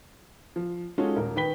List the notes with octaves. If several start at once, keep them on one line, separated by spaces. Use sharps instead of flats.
F3
G#3 C#4 D#4 F4 F#4 A4
D#1 A#4
D#3 B4 G5 B6 G7